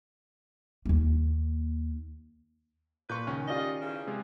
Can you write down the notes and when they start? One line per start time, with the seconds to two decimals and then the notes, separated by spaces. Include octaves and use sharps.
0.85 D#2 A#3
3.10 A#2 B4 C6 C#6 G6
3.27 C#2 D#3 C#4
3.48 F4 G4 D5 D#5
3.82 E2 C#3
4.07 C3 G#3